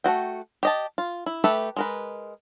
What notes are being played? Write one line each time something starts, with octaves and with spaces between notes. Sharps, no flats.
A3 E4 F#4 G5
G4 D#5 A5
F4
E4
A3 G4 A4 B4 E5
G#3 A#4 B4